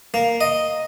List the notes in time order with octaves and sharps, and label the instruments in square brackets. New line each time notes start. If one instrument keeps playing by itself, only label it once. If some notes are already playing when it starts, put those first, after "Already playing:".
[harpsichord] A#3
D#5